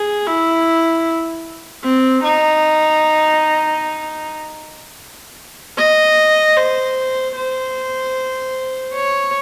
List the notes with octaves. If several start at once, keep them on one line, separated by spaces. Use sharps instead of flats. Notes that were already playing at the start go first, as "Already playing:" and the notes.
Already playing: G#4
E4
C4
D#4
D#5
C5
C5
C#5